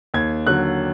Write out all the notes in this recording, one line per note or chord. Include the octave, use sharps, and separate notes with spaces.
D#2 G#6
D3 F#3 F#6